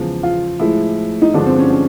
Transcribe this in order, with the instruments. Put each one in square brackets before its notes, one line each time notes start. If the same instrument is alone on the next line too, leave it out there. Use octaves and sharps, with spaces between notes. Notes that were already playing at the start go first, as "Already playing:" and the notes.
Already playing: [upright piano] E2 C#3 F3 G#3
F4
A2 F3 G#3 E4
D#4
G2 D3 F3 G#3 D4
C4
C#4
C#4